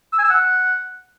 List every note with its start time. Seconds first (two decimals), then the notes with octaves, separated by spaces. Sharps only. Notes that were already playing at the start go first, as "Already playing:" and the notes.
0.13 E6
0.18 G#5
0.24 E6
0.30 F#5